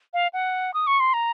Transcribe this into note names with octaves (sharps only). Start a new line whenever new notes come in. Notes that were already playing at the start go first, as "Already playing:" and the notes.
F5
F#5
D#6
C#6
C6
A#5